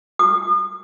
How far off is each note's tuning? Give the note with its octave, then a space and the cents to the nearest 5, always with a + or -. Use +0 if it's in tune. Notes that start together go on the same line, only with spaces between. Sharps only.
D#6 -40